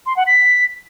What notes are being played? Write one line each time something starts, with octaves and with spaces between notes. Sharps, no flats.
C6
F#5
B6